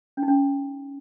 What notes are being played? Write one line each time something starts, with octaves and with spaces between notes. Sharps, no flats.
C#4
D#4
C#4